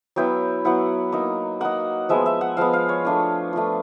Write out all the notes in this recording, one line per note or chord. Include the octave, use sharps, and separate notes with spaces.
F#3 B3 E4 G5
F#3 B3 E4 F#5
A#3 D#4
A#3 D#4 F#5
F3 G#3 B3 E5
E5
F#5
F3 G#3 B3 F5
F5
C#5
A3 D4 F4
A3 D4 F4